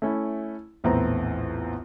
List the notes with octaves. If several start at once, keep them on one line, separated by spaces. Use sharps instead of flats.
A3 C#4 E4
A#1 E2 A2 B3 C4 A#5